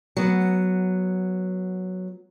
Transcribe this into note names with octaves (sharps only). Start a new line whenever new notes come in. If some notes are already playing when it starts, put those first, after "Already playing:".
F#3 B3